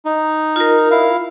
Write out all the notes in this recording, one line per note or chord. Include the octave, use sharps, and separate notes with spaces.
D#4
F4 A#4
E4 F5